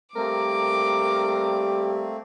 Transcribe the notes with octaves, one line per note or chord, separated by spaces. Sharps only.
G3 A3 A#3 C4 A#4 D6